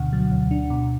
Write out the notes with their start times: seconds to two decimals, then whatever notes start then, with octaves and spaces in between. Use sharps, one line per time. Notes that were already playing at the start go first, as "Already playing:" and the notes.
Already playing: D2 B2 D3 F#5
0.13 F#3
0.31 D2
0.51 D4
0.70 B2